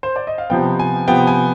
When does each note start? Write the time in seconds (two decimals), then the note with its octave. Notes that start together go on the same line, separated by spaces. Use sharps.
0.03 C5
0.16 D5
0.27 D#5
0.38 F5
0.50 C3 F3 B3 G5
0.79 G#5
1.08 C3 F3 B3 G5
1.27 G#5